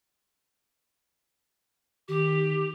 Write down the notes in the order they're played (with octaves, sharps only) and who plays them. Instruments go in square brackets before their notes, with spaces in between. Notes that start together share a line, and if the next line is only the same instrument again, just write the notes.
[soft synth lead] D#3 [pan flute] G4